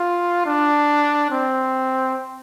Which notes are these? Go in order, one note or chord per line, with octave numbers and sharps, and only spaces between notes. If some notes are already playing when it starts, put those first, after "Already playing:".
Already playing: F4
D4
C4